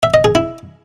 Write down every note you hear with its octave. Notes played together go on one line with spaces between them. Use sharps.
E5
D#5
G#4
E4